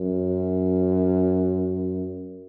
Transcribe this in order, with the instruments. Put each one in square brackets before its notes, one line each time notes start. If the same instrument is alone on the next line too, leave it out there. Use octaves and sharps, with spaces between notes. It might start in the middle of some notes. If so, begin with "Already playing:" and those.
Already playing: [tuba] F#2